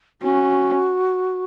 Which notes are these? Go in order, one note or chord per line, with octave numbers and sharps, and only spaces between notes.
C#4 F#4